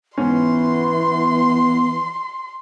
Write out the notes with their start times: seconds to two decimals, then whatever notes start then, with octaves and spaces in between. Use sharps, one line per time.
0.18 G#2 E3 B3 C#4 C6